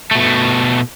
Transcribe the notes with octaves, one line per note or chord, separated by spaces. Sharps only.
B2 A3